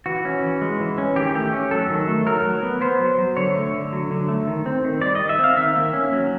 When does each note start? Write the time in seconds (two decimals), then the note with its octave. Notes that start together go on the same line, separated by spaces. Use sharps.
0.06 E3 F#4
0.25 C#4
0.42 E3
0.62 G#3
0.80 E3
0.98 C#4
1.16 D#3 G4
1.34 A3 G4
1.53 C#4
1.71 F#3 A4
1.90 D#3
2.08 A3
2.26 F#3 A#4
2.46 F#3
2.63 B3
2.81 B3 C5
3.00 F#3
3.18 F#3
3.37 D3 C#5
3.55 A3
3.74 D3
3.93 F#3
4.11 D3
4.28 A3
4.47 D#3
4.66 C4
4.84 D#3
5.02 G3 D5
5.15 D#3 D#5
5.29 E5
5.39 C4
5.44 F5
5.57 D#3 E5
5.76 A#3
5.93 C#4
6.13 F#3